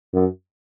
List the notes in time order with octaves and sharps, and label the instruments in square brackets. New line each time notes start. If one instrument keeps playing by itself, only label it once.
[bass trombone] F#2